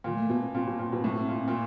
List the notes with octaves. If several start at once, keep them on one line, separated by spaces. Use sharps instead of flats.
A#2 D#3
G#3
A3
B2 B3
C4
A#2 C4
B2
A#2
B2
A2
A#2
A#2